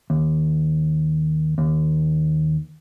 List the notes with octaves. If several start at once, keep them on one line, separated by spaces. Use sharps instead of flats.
D#2
D#2